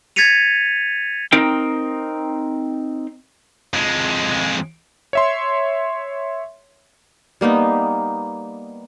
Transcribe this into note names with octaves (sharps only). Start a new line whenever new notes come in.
G#6 A6 B6 C#7 D#7 F7
C4 D#4 A#4 G5
F2 G#3
C#5 E5 C6
G3 A#3 B3 D#4